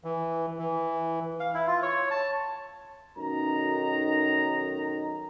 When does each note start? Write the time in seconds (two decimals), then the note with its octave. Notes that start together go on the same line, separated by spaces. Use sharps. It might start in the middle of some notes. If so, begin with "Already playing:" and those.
0.04 E3
0.59 E3
1.40 F5
1.54 E4
1.67 F4
1.82 C#5
2.11 A5
3.17 B1 F#2 D#3 D#4 A#5